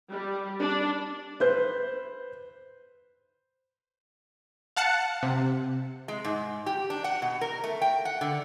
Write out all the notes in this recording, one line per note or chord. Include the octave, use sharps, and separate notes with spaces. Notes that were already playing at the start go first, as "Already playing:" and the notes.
G3
D4
B4 C5 G6
F5 F#5 A5 F#6 C#7
C3
G#3
G#2
G4
D4
F#5
B2
A#4
A3
G5
F#5
D3